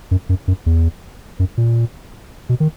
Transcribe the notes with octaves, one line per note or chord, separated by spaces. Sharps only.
F#2
F#2
F#2
E2
F#2
A#2
B2
D#3